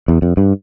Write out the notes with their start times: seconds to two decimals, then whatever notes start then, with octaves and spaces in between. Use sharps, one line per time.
0.08 E2
0.22 F2
0.37 G2